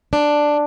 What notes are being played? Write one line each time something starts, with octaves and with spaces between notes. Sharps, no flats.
D4